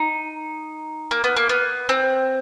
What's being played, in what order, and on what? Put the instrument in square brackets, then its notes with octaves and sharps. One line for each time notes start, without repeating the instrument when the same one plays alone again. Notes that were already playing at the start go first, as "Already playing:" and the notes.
Already playing: [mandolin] D#4
A#3
B3
A#3
B3
C4